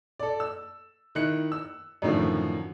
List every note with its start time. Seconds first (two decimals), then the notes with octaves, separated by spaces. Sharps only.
0.19 A4 D5
0.40 E6
1.15 D#3 E4 F#6 C#7
1.52 E6
2.02 F#2 A2 D3 D#3 F3